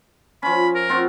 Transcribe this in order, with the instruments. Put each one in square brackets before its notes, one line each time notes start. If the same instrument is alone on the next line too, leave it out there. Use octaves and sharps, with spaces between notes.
[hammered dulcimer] F3 C#4 [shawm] B5
[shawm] A#4
[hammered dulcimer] C4 F4 F#4